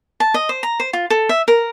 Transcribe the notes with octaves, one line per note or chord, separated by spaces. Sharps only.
A5
D#5
C5
A#5
C5
F4
A4
E5
A#4